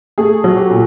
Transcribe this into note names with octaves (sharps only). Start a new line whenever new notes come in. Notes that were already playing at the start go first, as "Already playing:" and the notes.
A3 G#4
F#3
G4
A#2